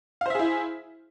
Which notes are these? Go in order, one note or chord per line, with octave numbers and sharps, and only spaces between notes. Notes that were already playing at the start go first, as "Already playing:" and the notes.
E4 G#4 C5 E5 F5